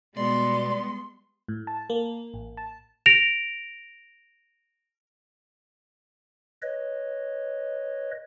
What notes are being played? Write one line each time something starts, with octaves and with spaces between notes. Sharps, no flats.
B2 G3 G#3 B3 D5 C6
A2
A5
A#3
A1
A5
A#6 D7 F7
B4 C#5 D#5